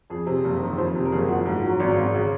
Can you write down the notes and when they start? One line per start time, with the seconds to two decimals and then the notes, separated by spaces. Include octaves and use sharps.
0.10 F2 G#4
0.27 C3
0.45 F#1
0.62 D#3
0.78 F2 C5
0.95 C3
1.05 A#4
1.12 F#1 G#4
1.29 F3 F#4
1.46 G#2
1.64 F#3
1.80 G#1
1.96 G#1
2.14 C#3